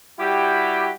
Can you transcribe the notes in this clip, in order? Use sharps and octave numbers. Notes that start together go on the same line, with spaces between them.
G3 E4 F#4 G4